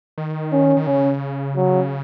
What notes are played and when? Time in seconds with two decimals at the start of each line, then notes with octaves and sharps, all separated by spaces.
0.18 D#3
0.52 C#4
0.77 D#3
0.86 C#3 C#4
1.56 F#3